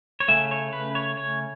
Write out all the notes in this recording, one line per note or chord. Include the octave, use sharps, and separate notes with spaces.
C#5
C#3 A3 C#4 E5
C#5
B4
C#5
C#5